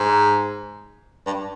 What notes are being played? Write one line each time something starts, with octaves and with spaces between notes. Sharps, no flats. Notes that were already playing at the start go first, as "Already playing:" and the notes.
Already playing: G#2
G2